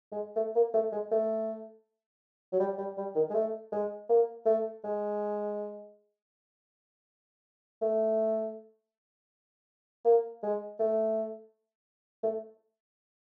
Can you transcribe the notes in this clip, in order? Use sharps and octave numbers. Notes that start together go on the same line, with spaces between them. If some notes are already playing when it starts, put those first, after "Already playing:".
G#3
A3
A#3
A3
G#3
A3
F#3
G3
G3
G3
D#3
G#3
A3
G#3
A#3
A3
G#3
A3
A#3
G#3
A3
A3